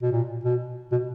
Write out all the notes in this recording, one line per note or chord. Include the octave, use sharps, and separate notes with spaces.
B2
A#2
B2
B2